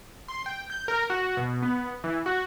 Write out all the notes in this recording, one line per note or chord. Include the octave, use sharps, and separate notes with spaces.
C6
G5
G6
A#4
F#4
B2
B3
E3
F#4